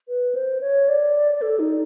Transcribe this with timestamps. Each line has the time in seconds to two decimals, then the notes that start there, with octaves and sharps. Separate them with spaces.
0.08 B4
0.35 C5
0.61 C#5
0.88 D5
1.41 A4
1.59 D#4